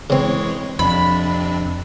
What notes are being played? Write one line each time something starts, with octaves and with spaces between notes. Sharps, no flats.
C#3 E3 G#3 C4 C#5
F2 C3 D4 B5